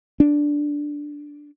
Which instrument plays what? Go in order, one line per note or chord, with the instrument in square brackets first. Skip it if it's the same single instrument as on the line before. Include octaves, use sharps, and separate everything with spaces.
[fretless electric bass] D4